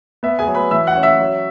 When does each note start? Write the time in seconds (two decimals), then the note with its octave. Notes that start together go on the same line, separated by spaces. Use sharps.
0.23 B3 E5
0.39 G#4 G#5
0.47 F#3
0.55 B4 B5
0.71 E3 E5 E6
0.87 F#5 F#6
0.95 C#4
1.03 E5 E6
1.19 F#3